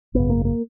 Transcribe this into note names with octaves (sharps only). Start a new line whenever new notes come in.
G#1 F#2 C#3 B3
A#3
A#3